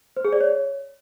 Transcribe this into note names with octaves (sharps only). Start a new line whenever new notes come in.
C5
G#4
D5
C#5